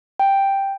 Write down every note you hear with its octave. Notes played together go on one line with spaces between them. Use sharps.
G5